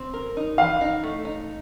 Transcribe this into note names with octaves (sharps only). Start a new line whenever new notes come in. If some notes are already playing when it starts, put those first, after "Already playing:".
Already playing: C4
A#4
D#4
E3 F5
D#4
A3
D#4